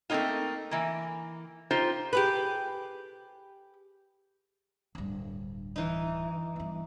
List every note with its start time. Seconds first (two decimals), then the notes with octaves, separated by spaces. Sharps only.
0.10 A3 A#3 C4 C#4 D#4 F4
0.71 E3 A#3
1.71 D#4 F4 G4 C5
2.13 G4 G#4 B4
4.95 D1 G2
5.76 E3 D#4
6.56 G2 B3